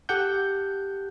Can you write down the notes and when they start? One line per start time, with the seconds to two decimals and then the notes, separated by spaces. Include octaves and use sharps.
0.09 G4 A4 F#5 G6